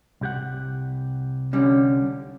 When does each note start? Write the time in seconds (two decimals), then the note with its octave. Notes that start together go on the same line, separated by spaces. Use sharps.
0.21 C2 G4 F#5
1.53 D3 G3 C#4